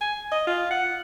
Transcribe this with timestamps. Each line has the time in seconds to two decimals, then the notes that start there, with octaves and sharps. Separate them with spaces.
0.01 G#5
0.32 D#5
0.47 F4
0.71 F#5